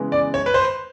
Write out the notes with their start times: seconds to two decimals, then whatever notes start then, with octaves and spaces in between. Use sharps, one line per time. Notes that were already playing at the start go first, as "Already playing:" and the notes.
Already playing: C#3 E3 G#3 B3
0.12 D5
0.34 C#5
0.46 B4
0.54 C5